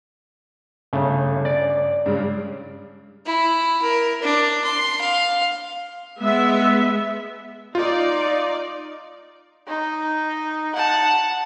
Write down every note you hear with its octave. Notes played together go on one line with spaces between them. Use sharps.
G1 C#3 A3
D5
G2 C#3 G#3
E4
A#4
D4
C6
F5
G#3 B3 E5
D#4 F4 D5
D#4
F#5 A5